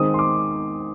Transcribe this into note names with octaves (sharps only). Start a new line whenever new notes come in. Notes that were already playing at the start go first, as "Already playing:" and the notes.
Already playing: D#3 G#3 C4 D#6
C6
D6